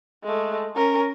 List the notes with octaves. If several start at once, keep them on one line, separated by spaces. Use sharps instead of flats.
G#3 A3
C#4 A#4